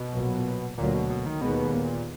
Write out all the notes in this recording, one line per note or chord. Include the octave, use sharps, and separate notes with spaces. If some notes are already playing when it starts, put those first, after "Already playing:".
Already playing: B2
B1 A#2 F#3 B3
D2 A#2 D3 F#3 A#3
B2
B2
D#3
D#2 B2 D#3 G#3 B3
A#2